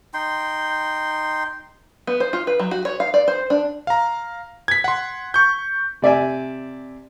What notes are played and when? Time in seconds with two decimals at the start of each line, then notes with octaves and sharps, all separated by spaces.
0.14 D#4 G5 C6
2.07 B3
2.20 C5
2.33 F4
2.47 B4
2.59 F#3
2.71 F#4
2.85 C#5
3.00 F5
3.14 D5
3.28 C5
3.50 D4
3.87 F5 A#5
4.68 G#6 B6
4.84 F#5 C6
5.34 C#6 G6
6.02 C3 D5 E5 G#5